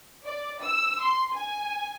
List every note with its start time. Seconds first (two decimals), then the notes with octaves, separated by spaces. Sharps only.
0.25 D5
0.60 E6
1.01 C6
1.33 G#5